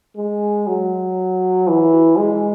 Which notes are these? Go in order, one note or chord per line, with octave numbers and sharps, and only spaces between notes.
G#3
F#3
E3
G#3